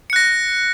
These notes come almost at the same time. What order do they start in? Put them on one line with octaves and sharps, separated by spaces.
C#7 F#6 A#6